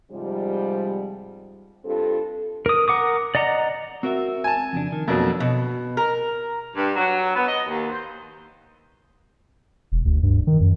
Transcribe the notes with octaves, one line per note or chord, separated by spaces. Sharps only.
G#2 C3 F3 G3
G2 C4 F4 A4
A#4 D#6
A#4 F#5 D6 D#6
D5 D#5 F#5 A#5
C4 F#4 A#4 E5
G#5 A5
F2 C#3 D4
D#3
F2 B2 F#3 A#3 D4 F#4
B2
A#4
G2
F#3
B3
D#5
D#2
C5
E1
D2
G2
D#3
F#2